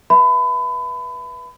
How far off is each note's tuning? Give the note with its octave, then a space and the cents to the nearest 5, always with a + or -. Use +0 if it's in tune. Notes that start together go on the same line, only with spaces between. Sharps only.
B4 -25 E5 +0 B5 +30